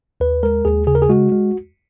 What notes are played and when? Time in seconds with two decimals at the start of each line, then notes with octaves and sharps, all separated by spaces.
0.20 D#2 B4
0.43 G#3 A#4
0.65 D#2 G#4
0.87 C#3 G#4
0.95 A#4
1.02 G#4
1.09 G#3 F#4
1.32 G#3